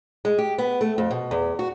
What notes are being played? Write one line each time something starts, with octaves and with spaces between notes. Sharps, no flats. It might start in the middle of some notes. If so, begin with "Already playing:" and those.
G#3
G4
B3
A3
F2
B2
E2
F#4